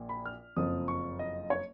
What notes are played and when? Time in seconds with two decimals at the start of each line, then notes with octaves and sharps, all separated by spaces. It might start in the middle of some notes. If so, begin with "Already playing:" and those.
Already playing: A#1 A#2
0.09 B5
0.26 F6
0.56 F#1 F2 F3 D#6
0.88 C#6
1.19 D#5
1.50 C#5